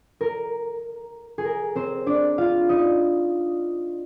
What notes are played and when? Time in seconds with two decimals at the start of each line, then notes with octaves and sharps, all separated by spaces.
0.21 A#4
1.38 G#4
1.45 A#4
1.75 C4 C5
2.06 D4 D5
2.38 F4 F5
2.69 D#4 D#5